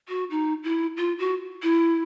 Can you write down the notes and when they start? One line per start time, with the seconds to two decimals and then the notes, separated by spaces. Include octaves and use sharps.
0.09 F#4
0.31 D#4
0.64 E4
0.97 F4
1.19 F#4
1.63 E4